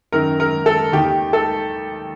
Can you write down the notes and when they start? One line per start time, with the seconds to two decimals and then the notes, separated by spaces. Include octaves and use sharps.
0.12 F#2 D#3 A#4
0.40 A#4
0.66 A4
0.93 D#2 D#3 G4
1.33 A4